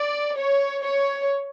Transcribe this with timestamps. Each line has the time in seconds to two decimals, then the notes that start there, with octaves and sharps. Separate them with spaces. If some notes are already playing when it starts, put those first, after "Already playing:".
Already playing: D5
0.37 C#5
0.83 C#5